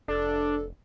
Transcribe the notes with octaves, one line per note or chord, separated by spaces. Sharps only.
F1 D4 A4